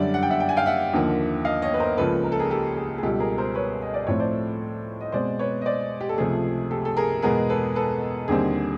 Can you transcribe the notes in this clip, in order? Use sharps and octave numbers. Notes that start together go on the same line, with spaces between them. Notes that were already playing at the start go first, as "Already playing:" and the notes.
Already playing: F#2 D3 G3 D5 E5
F#5
G5
E5 F#5
G5
G#5
F5 G5
E5 F#5
D#2 D3 F3 A#3
D#5 F5
C#5 D#5
B4
A#4 C5
C#2 C#3 F3 A#3 A4 B4
A#4
A4
G#4 A#4
G4 A4
G#4
G#4
C#2 B2 G3 G4 A4
G#4 A#4
A#4 C5
B4 C#5
D#5
D5
A2 F3 A3 C4 C#5
C5 D5
D#5
B2 G#3 C4 C5 D5
B4 C#5
D#5
C5 D5
G4
A4
C#2 C3 F3 A3 G#4
G4 A4
A4
G#4 A#4
E2 B2 G#3 B3 G#4 A#4
A4 B4
A4 B4
D#2 D3 G3 C4 G#4